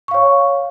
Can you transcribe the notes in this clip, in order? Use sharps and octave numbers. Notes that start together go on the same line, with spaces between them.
C#5 F5 C#6